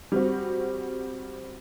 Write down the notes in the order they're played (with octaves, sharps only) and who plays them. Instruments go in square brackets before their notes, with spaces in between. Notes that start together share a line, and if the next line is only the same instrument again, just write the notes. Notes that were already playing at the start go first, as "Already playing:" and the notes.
[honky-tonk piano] G3 C4 F#4